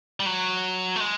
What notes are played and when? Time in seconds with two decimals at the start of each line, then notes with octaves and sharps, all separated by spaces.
0.20 G3
0.26 F#3
0.96 A3
1.00 G#3